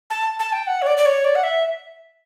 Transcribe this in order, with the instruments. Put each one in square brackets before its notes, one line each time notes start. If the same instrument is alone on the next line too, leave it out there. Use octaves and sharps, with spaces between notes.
[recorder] A5
A5
G5
F#5
C#5
D5
D5
C#5
D5
F#5
E5